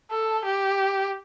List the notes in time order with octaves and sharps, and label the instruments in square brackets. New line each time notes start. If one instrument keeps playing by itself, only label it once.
[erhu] A4
G4